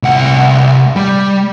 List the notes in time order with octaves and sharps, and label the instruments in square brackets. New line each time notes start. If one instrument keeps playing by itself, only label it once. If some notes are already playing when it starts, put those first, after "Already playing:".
[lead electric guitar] C2 F#5
G3